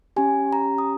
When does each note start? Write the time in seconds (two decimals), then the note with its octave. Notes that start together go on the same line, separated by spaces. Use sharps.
0.16 C#4 G4 G#5
0.53 A#5
0.78 D#6